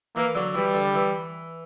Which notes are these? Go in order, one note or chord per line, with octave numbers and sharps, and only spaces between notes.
E3 A#3
D3 F#3
E3 G3
D3
E3